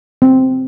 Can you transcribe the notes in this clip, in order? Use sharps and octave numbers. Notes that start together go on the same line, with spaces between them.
C4